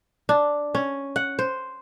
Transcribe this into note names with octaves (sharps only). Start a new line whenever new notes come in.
D4
C#4
F#5
C5